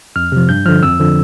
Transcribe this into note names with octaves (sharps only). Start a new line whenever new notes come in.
F2 F6
C3 F3
G2 G6
D3 F3 F6
F2 E6
D3 F3